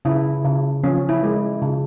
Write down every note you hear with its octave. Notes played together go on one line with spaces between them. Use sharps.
C#3 E4
C#3
F3 C#4
E4
G#3
C#3